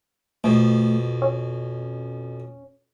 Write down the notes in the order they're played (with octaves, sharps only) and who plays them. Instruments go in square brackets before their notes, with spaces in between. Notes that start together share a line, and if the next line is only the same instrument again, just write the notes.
[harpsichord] F2 B2 [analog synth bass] A3
[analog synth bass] C#4